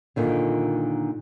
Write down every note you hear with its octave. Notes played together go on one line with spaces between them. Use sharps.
A#2 D3 D#3